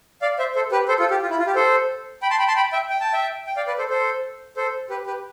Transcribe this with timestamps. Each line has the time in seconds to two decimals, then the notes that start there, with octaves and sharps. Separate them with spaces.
0.22 D5 F5
0.39 C5 E5
0.55 A4 C5
0.72 G4 B4
0.88 A4 C5
1.00 F4 A4
1.11 G4
1.22 F4
1.31 E4
1.39 F4
1.47 G4
1.55 A4 C5
2.22 G5 B5
2.30 A5 C6
2.39 G5 B5
2.48 A5 C6
2.56 G5 B5
2.72 E5 G5
2.90 G5
3.01 A5
3.13 E5 G5
3.47 G5
3.56 D5 F5
3.67 B4 D5
3.78 A4 C5
3.90 A4 C5
4.57 A4 C5
4.90 G4 B4
5.07 G4 B4